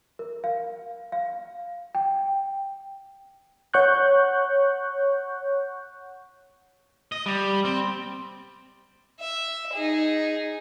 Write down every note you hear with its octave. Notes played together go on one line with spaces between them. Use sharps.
A#4
F5
F5
G5
C#5 F#5 C#6 F#6 G6
D#5
G3
C4
E5
D#4 G#4